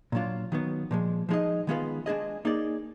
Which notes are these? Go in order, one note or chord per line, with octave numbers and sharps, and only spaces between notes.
A#2 F#3 D4 F4
D#3 F#3 B3
A#2 F3 G#3
F3 G#3 D#4 G#4 D#5
D#3 G#3 B3 F4 B4
G#3 D4 G#4 D#5
A#3 D#4 G#4 D5